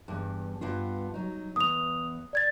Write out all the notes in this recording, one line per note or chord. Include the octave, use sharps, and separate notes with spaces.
E2 G2
G2 B3 F4
F#3 D#4
E2 B3 D#6 F7
D5 G#6 A6